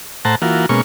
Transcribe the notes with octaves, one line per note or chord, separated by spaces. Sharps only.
A2 C5 F#5 A5 A#5
E3 A#3 F4 F#4
B2 G#3 A#3 C#4 C#6